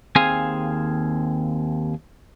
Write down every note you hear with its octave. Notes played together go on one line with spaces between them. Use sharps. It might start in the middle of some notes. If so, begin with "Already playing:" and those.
D#2 C4 G#4 C5 F5 G#5